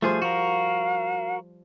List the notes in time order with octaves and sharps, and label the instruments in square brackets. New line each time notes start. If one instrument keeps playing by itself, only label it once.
[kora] F3 G3 C5 [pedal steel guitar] A3 G#4
[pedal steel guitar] F#4 A#4 [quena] F5